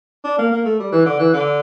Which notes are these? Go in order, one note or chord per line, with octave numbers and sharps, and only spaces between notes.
D4
A#3
A#3
A3
G3
E3
D3
E3
D3